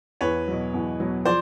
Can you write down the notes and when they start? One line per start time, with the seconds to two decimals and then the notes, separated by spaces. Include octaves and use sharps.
0.21 E2 B4 C#5
0.48 B2 F#3
0.74 E2
1.00 B2 F#3
1.25 F3 C5 D5